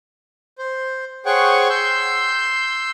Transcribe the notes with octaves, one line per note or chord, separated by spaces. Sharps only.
C5
G#4 C5 C#5 F#5 G5 C#6
C6 E6 G6